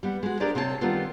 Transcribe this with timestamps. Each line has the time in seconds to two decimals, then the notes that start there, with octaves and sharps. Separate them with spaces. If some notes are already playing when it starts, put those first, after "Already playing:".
0.03 G3 B3
0.23 G#3 F#4
0.40 D4 G4 G#4 A#4 C5 D5
0.55 C3 C4 C#5 D#5 A5
0.81 D#3 G3 A3 B3 C4 F4